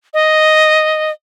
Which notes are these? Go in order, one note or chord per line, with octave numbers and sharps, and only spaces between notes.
D#5